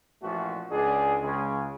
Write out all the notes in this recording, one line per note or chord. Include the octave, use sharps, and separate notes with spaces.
A1 A#2 F3 A3 D4 F#4
C#2 D4 G#4
C#2 C#3 G#3